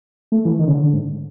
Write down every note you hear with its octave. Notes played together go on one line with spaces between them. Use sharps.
A3
E3
D#3
C#3
D3
D3
G#2